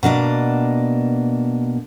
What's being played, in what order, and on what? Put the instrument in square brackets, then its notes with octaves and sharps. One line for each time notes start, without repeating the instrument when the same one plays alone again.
[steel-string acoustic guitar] B2 A#3 D4 D#5